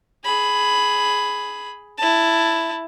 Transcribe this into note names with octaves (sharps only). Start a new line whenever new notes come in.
G#4 B5
E4 A5